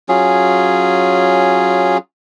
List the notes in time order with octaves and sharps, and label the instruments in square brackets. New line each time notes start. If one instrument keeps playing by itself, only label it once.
[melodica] F#3 C#4 F4 G#4